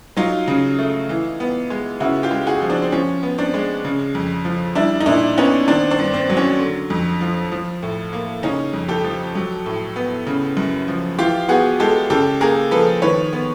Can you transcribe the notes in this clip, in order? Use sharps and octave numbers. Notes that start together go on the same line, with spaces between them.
F#3 D#4 F4
C#3
A3
E3
B3
G#3
C#3 E4 F#4
F4 G4
G#3
F#4 G#4
F3
C4 D4
C4
F3 C#4
B3
C4 D4
G#3
C#3
F2
F3
G3 D4 E4
D#4
A#2 D4 E4
B3 C#4 D#4
D#3 C4 D4
C4 D4
G2
C4
F#3
C#4
D3
F2
F3
F3
A2
A#3
C#3 C#4 D#4
F2
G4 A4
F3
F#3
A2
B3
C#3
F#2
F3
E3 F4 G4
B3 F#4 G#4
G#3 G4 A4
C#3 G4 A4
A#3 G#4 A#4
F3 A4 B4
D#3 B4 C#5
B3